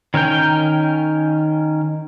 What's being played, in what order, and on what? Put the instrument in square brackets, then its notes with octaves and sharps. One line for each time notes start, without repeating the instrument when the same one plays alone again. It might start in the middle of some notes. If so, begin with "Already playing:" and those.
[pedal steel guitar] D#3 C#4 A#4 G5